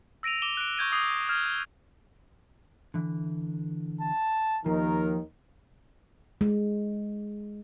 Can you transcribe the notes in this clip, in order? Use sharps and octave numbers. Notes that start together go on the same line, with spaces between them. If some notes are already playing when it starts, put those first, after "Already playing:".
E6 A#6 D7 D#7 F7
D6 E7 F7 G7
F#6 D7
C#6 G6 G#6 D#7
D6 D#6 C7
F6 G#6 E7
D3 E3
A5
D#2 D#3 F3 A#4
G#3